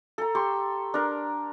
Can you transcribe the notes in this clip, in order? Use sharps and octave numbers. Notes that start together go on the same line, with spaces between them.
A4 A#5
G4 C6 C#6
D4 A#4